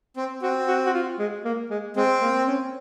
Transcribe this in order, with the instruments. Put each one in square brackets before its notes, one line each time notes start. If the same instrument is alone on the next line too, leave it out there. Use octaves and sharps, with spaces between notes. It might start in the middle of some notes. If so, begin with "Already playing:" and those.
[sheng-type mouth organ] C4
[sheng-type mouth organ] C4 [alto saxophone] F#4
[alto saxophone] F#4
F#4
F4
G#3
A#3
G#3
[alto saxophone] G#3 [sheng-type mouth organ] C4
[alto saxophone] A#3
C#4